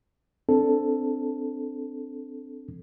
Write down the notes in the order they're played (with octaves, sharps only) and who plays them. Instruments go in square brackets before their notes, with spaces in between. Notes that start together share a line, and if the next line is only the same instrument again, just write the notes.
[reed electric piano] C4 D4 A4